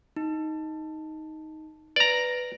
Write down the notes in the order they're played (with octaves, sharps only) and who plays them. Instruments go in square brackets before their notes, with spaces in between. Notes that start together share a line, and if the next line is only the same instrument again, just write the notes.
[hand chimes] D#4
[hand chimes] B4 [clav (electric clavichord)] D5 A#5